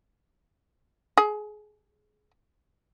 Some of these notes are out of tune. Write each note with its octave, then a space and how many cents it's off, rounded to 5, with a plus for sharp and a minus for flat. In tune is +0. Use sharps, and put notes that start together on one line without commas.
G#4 +25